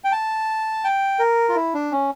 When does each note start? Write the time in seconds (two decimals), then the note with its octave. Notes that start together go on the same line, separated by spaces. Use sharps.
0.04 G5
0.12 A5
0.84 G5
1.19 A#4
1.49 F4
1.55 E4
1.74 D4
1.92 C#4